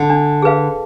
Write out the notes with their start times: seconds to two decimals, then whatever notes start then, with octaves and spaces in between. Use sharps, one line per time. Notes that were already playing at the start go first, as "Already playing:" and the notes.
Already playing: D3
0.10 D4
0.42 G#4 B4 F5